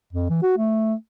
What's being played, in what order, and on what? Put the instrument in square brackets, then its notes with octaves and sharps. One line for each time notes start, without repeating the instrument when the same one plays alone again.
[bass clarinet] F2
E3
F#4
A3